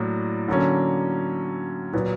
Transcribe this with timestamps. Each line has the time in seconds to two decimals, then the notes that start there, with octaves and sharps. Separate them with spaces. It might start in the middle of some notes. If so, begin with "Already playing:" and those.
Already playing: A2 F#3 A#3 D4
0.48 D3 F#3 A#3 C#4
1.93 A#2 F#3 B3